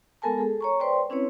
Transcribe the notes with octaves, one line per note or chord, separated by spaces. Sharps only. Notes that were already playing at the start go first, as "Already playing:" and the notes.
G#3 B3 A4 A#4 G#5 A5
G#4 A4
C#5 A#5 C#6
B4 C5 D5 G5 C6
C4 C#4 E4 B4 C#5